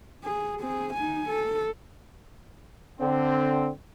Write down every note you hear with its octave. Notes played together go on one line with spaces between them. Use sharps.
G#4
C4 G#4
D#4 G#5
A4
D3 C4